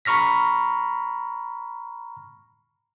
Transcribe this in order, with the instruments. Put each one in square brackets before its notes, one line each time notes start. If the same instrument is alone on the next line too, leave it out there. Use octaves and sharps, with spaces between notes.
[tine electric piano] A#5 B5 C#6 F6 A#6 B6